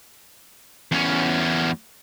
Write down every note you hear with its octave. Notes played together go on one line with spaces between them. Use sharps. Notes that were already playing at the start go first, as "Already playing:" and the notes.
E2 C#4